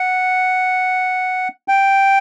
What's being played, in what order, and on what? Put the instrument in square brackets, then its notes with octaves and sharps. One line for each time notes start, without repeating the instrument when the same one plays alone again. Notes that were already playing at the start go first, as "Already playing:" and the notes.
Already playing: [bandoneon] F#5
G5